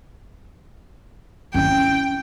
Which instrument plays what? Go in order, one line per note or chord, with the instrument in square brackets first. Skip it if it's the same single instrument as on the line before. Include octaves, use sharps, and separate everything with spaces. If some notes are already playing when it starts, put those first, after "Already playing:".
[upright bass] C#4 E4 [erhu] G5